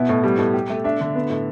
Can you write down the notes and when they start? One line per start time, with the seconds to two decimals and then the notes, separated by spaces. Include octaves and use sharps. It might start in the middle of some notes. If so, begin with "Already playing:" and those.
Already playing: B2 B3 E4
0.09 A2
0.24 G3
0.38 A2
0.54 G4
0.70 A3
0.84 D4 E5
1.01 D3
1.15 B3
1.30 A2